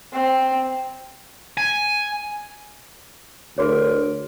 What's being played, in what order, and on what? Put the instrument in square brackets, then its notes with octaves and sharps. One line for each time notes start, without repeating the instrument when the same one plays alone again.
[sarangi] C4
[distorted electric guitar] G#5
[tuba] D2 [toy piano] F#4 G#4 C#5 [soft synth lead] A#4